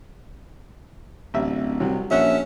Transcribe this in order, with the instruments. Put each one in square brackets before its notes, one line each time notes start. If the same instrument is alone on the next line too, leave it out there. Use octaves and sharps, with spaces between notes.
[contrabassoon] D1 [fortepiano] A1 E5
[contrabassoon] C2 [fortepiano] C3 F#3 G3
[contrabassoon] A#1 [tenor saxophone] C#4 [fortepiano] F#4 F#5 [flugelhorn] E5